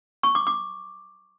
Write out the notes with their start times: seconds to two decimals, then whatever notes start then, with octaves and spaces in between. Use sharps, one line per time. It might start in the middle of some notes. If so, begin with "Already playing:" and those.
0.23 C#6
0.35 D6
0.47 D6